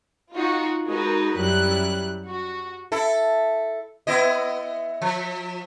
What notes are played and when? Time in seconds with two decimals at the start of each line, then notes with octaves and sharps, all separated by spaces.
0.33 D#4 F4 F#4
0.87 G#3 D#4 F#4 G#4 A#4 B4
1.38 F#2 F#3 G3 E4 F#6
2.28 F#4
2.92 E4 A4
4.07 B3 E4 D#5
5.02 F3